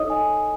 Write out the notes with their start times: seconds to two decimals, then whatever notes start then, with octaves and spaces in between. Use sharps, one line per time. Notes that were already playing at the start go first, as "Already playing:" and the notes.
Already playing: D#4 A4 C#5 D#5 D#6
0.10 G#5